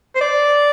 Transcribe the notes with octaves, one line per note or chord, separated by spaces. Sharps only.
C5
D5